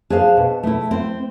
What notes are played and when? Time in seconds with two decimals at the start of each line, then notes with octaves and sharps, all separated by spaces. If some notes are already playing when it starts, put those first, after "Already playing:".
0.10 D4 G#4 C5 F5
0.37 B2
0.63 A3 E4
0.91 C4